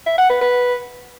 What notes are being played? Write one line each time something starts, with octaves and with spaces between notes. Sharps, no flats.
E5
F#5
B4
B4